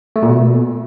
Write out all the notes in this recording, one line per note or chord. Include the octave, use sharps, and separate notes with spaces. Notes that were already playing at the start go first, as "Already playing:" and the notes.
A3
A#2
B2